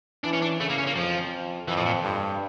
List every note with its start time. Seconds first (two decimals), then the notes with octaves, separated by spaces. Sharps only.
0.24 E3 D4
0.33 C#4
0.42 D4
0.60 C#3 A3
0.69 A#3
0.78 C#4
0.86 A#3
0.96 F2 F3
1.68 F2 E3
1.77 A2
1.86 A#2
2.04 G2